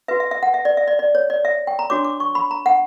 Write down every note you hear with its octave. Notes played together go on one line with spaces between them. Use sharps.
F#4 B4 E5
E5
E5
F#5
E5
D5
E5
D5
D5
C#5
D5
E5
G5
A#5
D4 F#4 C#5 D6
D6
C#6
B5
A#5
F#5